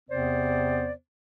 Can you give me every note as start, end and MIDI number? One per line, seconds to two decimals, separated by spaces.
0.10 0.92 40
0.10 0.92 48
0.10 0.92 59
0.10 0.92 60
0.10 0.92 72
0.10 0.92 74